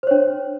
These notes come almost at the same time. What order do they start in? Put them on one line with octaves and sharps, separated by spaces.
C5 C#5 D4